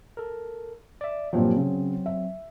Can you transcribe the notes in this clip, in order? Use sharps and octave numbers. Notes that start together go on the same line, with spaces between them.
A4 A#4
D5 E5
G2 A#2 F3 F#3 C4
C#3
E5